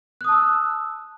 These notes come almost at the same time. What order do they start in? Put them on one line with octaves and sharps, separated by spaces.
F#6 D#6 A5 E6